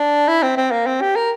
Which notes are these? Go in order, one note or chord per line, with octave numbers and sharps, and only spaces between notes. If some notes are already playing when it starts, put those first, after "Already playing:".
Already playing: D4
E4
C4
C4
A#3
C4
G4
A#4